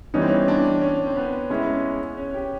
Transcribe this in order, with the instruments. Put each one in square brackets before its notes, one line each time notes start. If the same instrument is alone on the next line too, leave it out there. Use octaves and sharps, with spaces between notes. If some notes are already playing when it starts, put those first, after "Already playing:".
[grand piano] E3 G3 B3 D#4 [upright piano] C#4
[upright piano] C4
C#4
D4
C#4
C4
B3
[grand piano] G#3 C#4 E4
[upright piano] C#4
G4